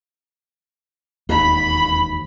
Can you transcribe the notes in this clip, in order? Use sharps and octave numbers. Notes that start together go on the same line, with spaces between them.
E1 D#2 B5